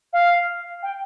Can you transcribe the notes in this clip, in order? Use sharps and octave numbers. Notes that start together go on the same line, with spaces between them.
F5
G5